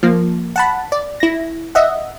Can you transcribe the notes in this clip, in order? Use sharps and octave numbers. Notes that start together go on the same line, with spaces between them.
F3 A#3
F#5 A5 B5
D5
E4 A#6
D#5 E5 F#5